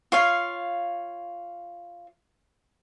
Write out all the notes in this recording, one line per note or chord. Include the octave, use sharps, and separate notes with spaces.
F4 C#5 F5